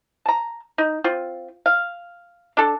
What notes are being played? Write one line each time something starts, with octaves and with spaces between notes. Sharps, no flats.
A5 A#5
D#4
C4 F4
F5
D4 A4